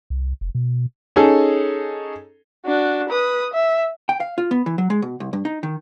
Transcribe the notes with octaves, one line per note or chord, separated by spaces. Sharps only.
C2
F1
B2
C#4 D#4 G#4 A4
D4 F#4
B4 D#6
E5
G5
F5
F4
B3
E3
F#3
G#3
B2
C2
G2
D#4
D#3